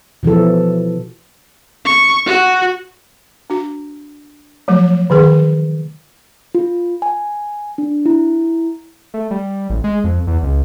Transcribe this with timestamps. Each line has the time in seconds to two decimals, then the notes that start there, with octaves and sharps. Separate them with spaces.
0.23 B2 E3 F3 A4
1.86 C#6
2.26 F#4
3.50 D4 F#4
4.68 F3 F#3 A3
5.10 D3 D#3 G#4
6.55 F4
7.02 G#5
7.78 D4
8.06 E4
9.14 A3
9.31 G3
9.70 A1
9.84 G#3
10.04 F2
10.27 E2
10.43 C#2